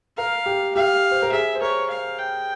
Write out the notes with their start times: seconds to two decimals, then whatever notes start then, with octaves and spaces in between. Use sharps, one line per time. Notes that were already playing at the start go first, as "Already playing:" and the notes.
0.17 A#4 F5
0.46 G4
0.75 G4 F5
1.11 C5
1.22 A#4
1.32 G#4 E5
1.55 C5
1.62 A#4 C#5
1.91 F5
2.19 G5